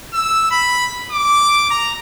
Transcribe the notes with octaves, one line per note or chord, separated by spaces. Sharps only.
E6
B5
D6
A#5